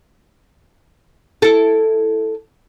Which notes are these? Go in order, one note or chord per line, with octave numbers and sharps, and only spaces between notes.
E4 A4